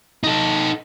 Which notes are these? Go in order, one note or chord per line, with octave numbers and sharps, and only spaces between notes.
D#4 A4